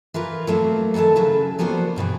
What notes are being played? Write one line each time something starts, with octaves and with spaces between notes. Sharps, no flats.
E3 F4 A#4 B4
F#3 A3 A#3 C4
D#3 E3 F#3 A3 A4
C#3 F#3 E4 A4 B4
F3 G3 A#3 B3 F#4 C5
G2 B2 D3 E3